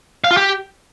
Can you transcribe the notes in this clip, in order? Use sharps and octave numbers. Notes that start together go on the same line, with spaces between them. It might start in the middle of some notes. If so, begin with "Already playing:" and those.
F5
F4
G4